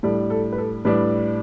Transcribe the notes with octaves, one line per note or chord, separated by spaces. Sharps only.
A2 G3 D4 A4
A4
B4
A4
A2 G3 D4 B4